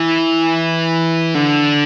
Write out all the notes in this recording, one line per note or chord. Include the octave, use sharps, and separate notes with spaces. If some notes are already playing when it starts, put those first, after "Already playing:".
Already playing: E3
D3